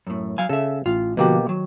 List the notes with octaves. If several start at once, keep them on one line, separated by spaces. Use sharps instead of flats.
F#2 A2
F#3 F5 G#5
C#3 A4 E5
A1 F4
B2 D3 F3 A#3 F#4 G4
D#3 F#3